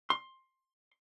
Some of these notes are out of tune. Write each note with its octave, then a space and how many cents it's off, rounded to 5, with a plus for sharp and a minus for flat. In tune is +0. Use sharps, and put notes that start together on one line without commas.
C6 +15